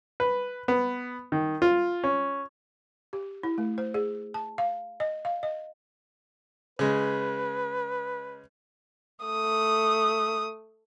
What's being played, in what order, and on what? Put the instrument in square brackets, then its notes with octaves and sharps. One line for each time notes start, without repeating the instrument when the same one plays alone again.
[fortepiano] B4
B3
D#3
F4
C#4
[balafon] G4
E4
A3
C5
G#4
A5
F5
D#5
F5
D#5
[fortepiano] C#3 G#3 [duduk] B4
[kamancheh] A3 D#6